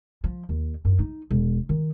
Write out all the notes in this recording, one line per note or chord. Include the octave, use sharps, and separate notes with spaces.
F3
D#2
F#2
D#4
E1
D#3